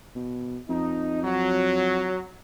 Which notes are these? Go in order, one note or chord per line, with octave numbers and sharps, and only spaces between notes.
B2
F2 D#4
F#3